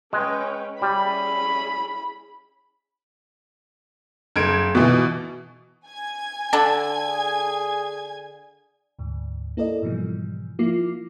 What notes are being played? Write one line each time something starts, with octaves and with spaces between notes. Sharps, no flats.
G#3 C#4 B4 G5
G3 C#4 E4 G#4 B5
F#1 G#6 D7
B2 E3
G#5 G#6
D3 D4 A4
G#4
D2 G#2
A#3 E4 A4 A#4 D5 D#5
G#2 B2 E3 F3 G3
F3 A#3 E4 F4 D6 C7